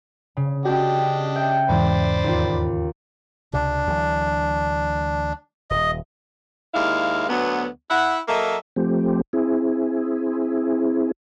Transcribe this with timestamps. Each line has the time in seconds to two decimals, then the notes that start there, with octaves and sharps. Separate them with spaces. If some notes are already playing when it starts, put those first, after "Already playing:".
0.37 C#3
0.65 C#4 D4 F#4 G4 D#5 G5
1.36 E5 G5 G6
1.69 E2 G#2 E3 C5 D5 B5
2.24 D#2 F4
3.53 C#2 C3 D4
3.87 D2 E3 F#3
5.70 D#1 D#5
6.75 D#2 G#3 E4 F5
7.29 D2 F#3 B3
7.91 E4 E5 F#5
8.28 F#3 A#3 A4 D#5 E5
8.76 F3 A3 C4 G4
9.33 C4 E4 G#4